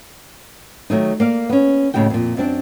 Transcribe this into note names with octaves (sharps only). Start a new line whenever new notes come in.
D#3 F#3 A3 D#4
A#3 D5 F5
B3 C#4
D#2 A2 C#3 F#4 G5
F2 A#2
F#2 C4 D4